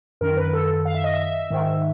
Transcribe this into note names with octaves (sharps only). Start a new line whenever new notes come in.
F#2 D#3 A#4
B4
A4
F5
E5
D#5
E5
G#2 D#3